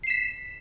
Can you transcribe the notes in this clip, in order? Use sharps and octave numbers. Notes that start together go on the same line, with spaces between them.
B6 C7 E7